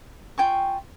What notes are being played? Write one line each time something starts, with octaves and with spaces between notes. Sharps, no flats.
F4 G5 G#5 C#6